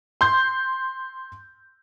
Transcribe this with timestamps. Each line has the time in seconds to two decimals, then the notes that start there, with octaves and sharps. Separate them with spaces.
0.21 C6 G6